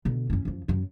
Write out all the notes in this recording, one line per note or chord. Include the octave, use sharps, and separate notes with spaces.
B2 D3
F#2 C#4
F#2 F3
F#2 B3